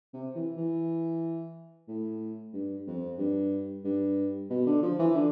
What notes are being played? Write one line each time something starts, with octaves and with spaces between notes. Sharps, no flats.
C3
E3
E3
A2
G2
F2
G2
G2
B2
D3
F3
E3
D3